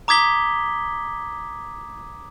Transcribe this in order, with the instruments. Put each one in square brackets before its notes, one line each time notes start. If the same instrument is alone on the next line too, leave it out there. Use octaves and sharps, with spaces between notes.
[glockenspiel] A#5 D6 D#6 G#6 B6 G7